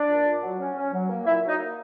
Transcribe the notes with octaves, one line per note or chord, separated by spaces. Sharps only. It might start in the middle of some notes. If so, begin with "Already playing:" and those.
Already playing: D4 D5
A#2
A#2
F#3
C#4
C#4
F#3
A#3
A#2 E4 E5
F#3
D#4 D#5
A#3